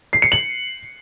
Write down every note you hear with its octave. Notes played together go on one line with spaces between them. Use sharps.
C7
C#7
F#7